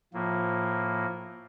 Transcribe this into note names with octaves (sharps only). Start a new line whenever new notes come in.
A2 F3 A#3